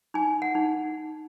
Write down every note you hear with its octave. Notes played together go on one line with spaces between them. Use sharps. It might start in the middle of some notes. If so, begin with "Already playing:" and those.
D#4 G#5
F#5
D#4